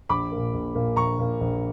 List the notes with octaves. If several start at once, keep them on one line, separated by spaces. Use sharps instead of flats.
A#1 B5 D6
A#2 A#3
A#1
A#2 A#3
A#1 A#5 C#6
A#2 A#3
A#1